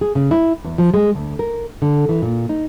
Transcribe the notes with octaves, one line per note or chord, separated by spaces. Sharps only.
G#4
C#3
E4
E2
F3
G#3
D2
A#4
D3
E3
A#2
D#4